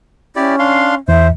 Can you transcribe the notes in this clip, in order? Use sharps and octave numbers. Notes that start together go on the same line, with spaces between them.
C#4 E4 G4 D5
D4 F5 C6
E2 E3 C5 E5